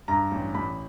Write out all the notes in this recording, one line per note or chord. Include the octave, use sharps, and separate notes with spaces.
G2 A#5
A1
A1 B5